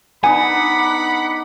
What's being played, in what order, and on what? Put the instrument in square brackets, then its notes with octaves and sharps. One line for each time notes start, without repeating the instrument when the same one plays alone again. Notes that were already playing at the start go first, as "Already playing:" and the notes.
[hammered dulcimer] B3 D4 D#4 [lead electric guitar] F#5 [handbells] G#5 [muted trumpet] B5